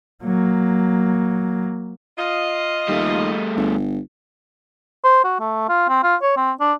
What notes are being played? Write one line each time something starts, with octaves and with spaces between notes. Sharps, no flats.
F#3 A#3
F4 D#5
D#2 G3 A3
G1
C5
F#4
A3
F4
C4
F4
C#5
C4
D4